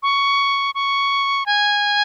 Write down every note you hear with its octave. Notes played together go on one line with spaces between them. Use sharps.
C#6
C#6
G#5